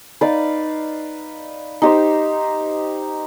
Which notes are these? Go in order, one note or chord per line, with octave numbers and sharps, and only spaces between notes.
D#4 B4 D5 F5
D#4 G4 C5